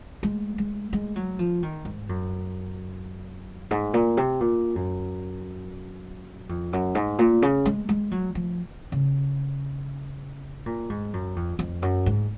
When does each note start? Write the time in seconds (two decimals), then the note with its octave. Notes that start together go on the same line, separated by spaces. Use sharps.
0.23 G#3
0.58 G#3
0.93 G#3
1.16 F#3
1.39 F3
1.63 D#3
1.85 G#2
2.09 F#2
3.71 G#2
3.94 A#2
4.17 C3
4.41 A#2
4.76 F#2
6.49 F2
6.73 F#2
6.95 G#2
7.19 A#2
7.42 C#3
7.65 G#3
7.89 G#3
8.11 F#3
8.35 F3
8.92 C#3
10.66 A#2
10.90 G#2
11.13 F#2
11.36 F2
11.59 F2
11.82 F#2
12.06 G#2